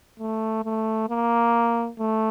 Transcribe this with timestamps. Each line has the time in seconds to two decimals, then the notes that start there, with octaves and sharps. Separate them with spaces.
0.20 A3
0.64 A3
1.09 A#3
1.99 A3